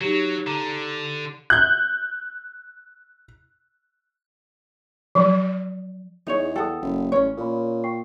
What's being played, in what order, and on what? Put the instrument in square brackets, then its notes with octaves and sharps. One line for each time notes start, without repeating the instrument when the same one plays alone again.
[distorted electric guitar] F#3 [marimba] D#4 G4
[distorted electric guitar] D3 [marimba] A#5
[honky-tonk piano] F#6 G6
[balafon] F3 F#3
[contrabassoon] E2 [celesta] D4 G#4 F7 [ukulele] D#4 C#5
[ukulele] A4 F#5 [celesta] G5 A5 D#6
[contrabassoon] F#1
[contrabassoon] A1 [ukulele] C#4 C#5
[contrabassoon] A#2 [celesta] A#4 D5 B5
[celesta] G5 C#6 C7